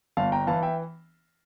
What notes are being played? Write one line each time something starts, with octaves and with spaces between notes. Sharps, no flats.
G1 F5 A5
G5 A#5
E3 F5 A5
E5 G5